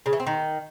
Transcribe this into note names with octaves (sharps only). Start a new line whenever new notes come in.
C#3
E3
C4
D#3